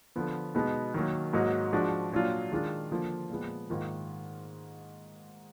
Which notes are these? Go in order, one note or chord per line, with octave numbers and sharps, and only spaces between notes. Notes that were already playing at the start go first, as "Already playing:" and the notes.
D3 F3 B3
B2 G#3 B3 D#4
D#3 F#3 A#3
G#2 F#3 A#3 D#4 F#4
F3 G#3 D4 F#4
A#2 F#3 D4 F4
D#3 G#3 D4 F4
D3 F3 A#3 F4
A#2 F3 G#3 B3
G#2 D#3 A#3 F4